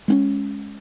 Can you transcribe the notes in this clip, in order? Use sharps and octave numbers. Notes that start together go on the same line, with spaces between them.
G#3 C4 C#4